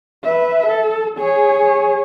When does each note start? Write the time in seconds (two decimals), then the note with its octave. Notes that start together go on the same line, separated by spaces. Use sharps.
0.24 B4 E5
0.67 A4
1.17 G#4 C#5